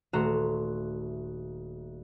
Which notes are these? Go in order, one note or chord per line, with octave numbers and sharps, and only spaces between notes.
D#1 A3 F#4 A#5 C6 E7